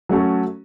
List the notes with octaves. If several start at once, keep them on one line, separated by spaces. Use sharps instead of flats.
F#3 A3 C#4 F#4 A4